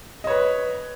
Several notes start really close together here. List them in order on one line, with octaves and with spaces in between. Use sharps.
D#5 C#5 B4